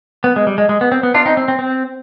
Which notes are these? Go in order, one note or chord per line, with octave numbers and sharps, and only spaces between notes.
B3
G#3
G3
G#3
G#3
B3
C4
B3
D4 F4
C4 D#4
C4
C4
C4